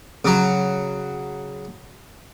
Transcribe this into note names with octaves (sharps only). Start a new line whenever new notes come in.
C#3 F#3